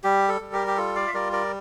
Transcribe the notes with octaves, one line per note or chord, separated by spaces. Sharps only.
G3 G4
A4
G3
G4 A#4
G4
F4 A4
D5 F5
E5
G3 A#4 D5
A#4 D5